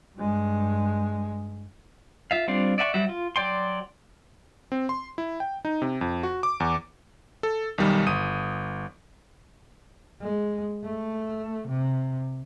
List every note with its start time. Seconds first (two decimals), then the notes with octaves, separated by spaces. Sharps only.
0.17 G2 G#3
2.31 F4 E5 F5
2.48 G3 C4 D4 F4 F5
2.78 D5 E5 F#5 G#5 C#6
2.94 F#3 G3 F#4 E5
3.09 F4
3.36 F#3 D5 G5 C6
4.72 C4
4.89 C6
5.18 E4
5.40 G5
5.65 D#4
5.82 C3
6.01 F2
6.23 F#4
6.43 D6
6.60 E2
7.43 A4
7.78 B1 D#3 G3
8.06 G1 D#6 D#7
10.21 G#3
10.84 A3
11.68 C3